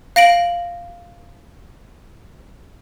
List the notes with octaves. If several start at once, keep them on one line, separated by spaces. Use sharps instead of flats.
F5 A#6 D7 F#7